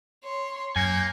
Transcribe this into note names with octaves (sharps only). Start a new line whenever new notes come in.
C#5 C6
F#2 A#3 G#5 G6 G#6 C#7